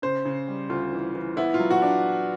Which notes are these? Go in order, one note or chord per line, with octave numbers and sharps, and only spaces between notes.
C#3 C5
C#3
G3
D2 F4
E3
E3
B3 E4
F4
F#3
F#4
D4